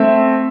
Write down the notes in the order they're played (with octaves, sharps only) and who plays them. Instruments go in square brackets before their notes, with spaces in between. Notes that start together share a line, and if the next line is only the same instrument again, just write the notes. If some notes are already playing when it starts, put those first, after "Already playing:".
Already playing: [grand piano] A3 C4 E5